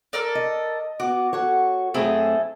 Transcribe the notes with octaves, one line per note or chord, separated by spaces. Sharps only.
A4 A#4 D5
D#5
B3 F#4 D6
F#4 A4 C#5
F#2 A3 C4 E4 G#4 A4